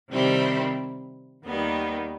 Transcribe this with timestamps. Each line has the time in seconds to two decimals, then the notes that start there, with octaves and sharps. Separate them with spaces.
0.10 C3 D#3 G3 C4 E4
1.45 D#2 D#3 G3 B3